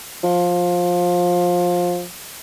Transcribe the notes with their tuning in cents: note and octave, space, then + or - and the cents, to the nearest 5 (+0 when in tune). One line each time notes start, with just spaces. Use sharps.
F3 +20